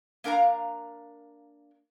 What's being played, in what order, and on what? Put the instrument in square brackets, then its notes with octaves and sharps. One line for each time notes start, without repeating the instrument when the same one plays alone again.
[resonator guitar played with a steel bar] A#3 D4 A#4 F5 A#5